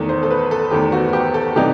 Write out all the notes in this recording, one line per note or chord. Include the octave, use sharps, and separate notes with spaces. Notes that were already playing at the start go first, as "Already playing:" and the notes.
Already playing: E2 D#3 A3
C5
A4
B4
A4
E2 D#3 A3 G4
F#4
G4
A4
C3 E3 G3 D#4 G4